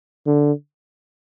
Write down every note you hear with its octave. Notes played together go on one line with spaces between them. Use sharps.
D3